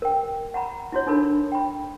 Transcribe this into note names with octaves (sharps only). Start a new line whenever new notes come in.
A#4 G5
F#5 A#5 B5
E4 F#4 C#5
D4 D#4 A4 A#4 B5
G5 B5